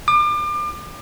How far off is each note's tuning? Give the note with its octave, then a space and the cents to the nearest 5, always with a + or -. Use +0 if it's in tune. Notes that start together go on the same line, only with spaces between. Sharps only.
D6 +35